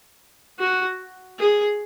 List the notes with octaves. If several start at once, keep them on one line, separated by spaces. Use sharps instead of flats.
F#4
G#4